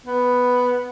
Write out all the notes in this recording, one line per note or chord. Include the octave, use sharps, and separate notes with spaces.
B3